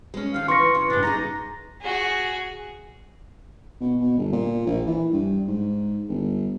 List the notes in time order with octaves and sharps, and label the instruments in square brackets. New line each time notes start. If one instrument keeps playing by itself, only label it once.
[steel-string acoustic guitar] G#3 C#4
[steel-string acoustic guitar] D#3 F3 [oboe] F5
[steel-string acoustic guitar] E3 [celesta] C6 A#6 [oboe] C#6
[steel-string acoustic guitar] C#3 E3
[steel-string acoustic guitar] G2 C#3 [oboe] D4
[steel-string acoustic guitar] D#4 E4 G#4 [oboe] A#5
[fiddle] F#4 G#4
[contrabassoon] B2
B2
G1
A#2
A#1
E3
G2
G#2
G1